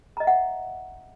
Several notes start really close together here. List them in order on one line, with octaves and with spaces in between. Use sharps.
A#5 D#5 E5 F#5